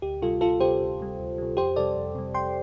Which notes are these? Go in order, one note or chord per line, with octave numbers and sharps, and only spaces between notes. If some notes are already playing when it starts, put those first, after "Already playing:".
D2 G4
C3 G3 F4 A4
D2 F4 A4
C3 G3 G4 C5
D2
C3 G3
D2
C3 G3
F2 G4 C5
C3 G3 A4 D5
F2
C3 G3
F2 G5 C6